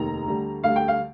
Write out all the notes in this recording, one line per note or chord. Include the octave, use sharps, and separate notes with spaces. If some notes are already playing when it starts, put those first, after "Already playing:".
Already playing: F1 D#2 D#3 A#5
D2 D3 G3
D2 D3 G3 F5
G5
F5